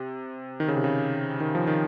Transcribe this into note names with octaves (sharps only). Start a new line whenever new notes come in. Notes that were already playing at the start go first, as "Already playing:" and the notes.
Already playing: C3
D#3
C#3
C3
C#3
D#3
F3
D#3